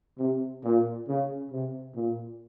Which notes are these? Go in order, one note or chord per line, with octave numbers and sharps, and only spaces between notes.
C3
A#2
C#3
C3
A#2